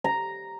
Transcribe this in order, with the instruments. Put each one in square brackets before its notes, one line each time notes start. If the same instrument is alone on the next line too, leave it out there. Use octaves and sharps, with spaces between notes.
[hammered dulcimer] A#5